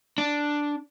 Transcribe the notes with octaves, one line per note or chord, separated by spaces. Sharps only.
D4